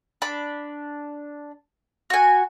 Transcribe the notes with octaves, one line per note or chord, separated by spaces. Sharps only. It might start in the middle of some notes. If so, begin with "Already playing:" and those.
D4 B5
F#4 G#5